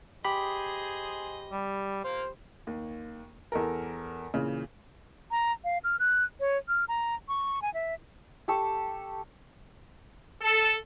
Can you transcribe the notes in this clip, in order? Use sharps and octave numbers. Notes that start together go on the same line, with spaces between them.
G4 G#4 C5 D#5 B5
G3
A#3 F4 C5
D#2
E2 A4 A#4
A#2 C#3 E3
A#5
F5
F6
F#6
C#5
F6
A#5
C#6
G#5
E5
G4 A4 C#6
A4